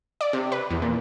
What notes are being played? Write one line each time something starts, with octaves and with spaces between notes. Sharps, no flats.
D5
C3
B4
E2
A#2